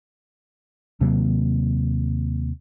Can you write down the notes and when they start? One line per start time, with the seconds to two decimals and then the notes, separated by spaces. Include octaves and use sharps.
1.01 D#2 C3 F#3 A#3